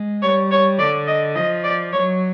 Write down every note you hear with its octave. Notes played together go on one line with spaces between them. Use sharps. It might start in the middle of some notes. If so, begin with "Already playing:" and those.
Already playing: G#3
G3 C#5
C#5
D3 D5
D#5
F3 D#5
D5
F#3 C#5